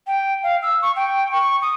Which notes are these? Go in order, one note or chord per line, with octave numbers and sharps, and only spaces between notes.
G5
F5
E6
C#6
G5
C#6
D#6